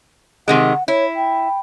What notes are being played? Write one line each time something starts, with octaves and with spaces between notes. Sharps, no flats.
C3 D#3 G#3 F#5
E4 C#5
G5